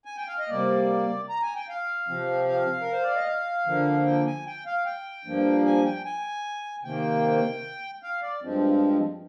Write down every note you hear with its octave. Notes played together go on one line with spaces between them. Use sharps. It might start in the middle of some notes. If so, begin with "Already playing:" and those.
G#5
G5
F5
D#5
C3 G3 A#3 D5
A#5
G#5
G5
F5
C3 F3 C4
F5
A#4
C5
D5
D#5
F5
D3 F3 A#3
G5
G#5
G5
F5
G5
G2 F3 A#3
G#5
G5
G#5
C3 D#3 A#3 G5
F5
D5
G2 F3 G#3 C4